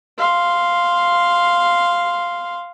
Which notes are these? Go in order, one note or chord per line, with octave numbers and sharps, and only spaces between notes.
F5 C6